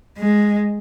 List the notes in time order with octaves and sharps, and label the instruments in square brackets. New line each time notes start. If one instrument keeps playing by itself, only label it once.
[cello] G#3